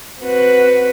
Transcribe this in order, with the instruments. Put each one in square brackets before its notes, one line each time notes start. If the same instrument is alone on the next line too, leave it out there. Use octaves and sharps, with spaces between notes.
[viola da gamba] C4 F#4 B4